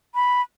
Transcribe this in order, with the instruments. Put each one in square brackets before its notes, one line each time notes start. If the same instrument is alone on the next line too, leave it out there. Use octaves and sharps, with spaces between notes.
[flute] B5